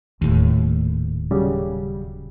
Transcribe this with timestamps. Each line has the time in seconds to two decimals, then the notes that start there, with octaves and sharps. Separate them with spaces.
0.22 D#1 D#2 A2
1.31 C#3 F#3 G3